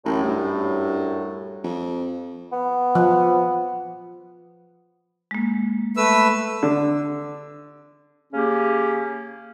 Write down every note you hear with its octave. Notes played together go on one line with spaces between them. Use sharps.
A1 F#2 A2
G2
F2
B3
F3
G#3 A#3
A3 B4 E6
D3
C#3 A#3 C#4 G4 G#4